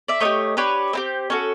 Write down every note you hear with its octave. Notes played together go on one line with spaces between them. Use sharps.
D5 E5
A3 D4 G4 C#5 D#5
D4 G4 B4 C#5
C4 E4 G4
C#4 F#4 A4 A#4